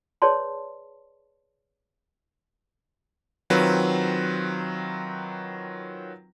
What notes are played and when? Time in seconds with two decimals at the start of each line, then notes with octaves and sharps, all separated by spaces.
0.22 G#4 B4 C#5 D5 A5 C6
3.50 D#3 F#3 C4 F4 B4